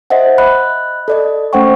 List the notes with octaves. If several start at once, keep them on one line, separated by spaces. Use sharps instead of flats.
C5 D#5 E5 F#5
D#5 B5 F#6
A4 D5 D#5
A3 C#4 C5 F#5 G5 C#6